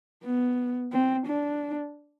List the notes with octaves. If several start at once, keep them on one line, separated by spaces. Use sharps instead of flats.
B3
C4
D4